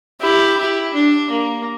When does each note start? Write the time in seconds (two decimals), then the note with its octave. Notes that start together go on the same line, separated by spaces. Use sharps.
0.21 E4 G4
0.57 E4
0.94 D4
1.30 A#3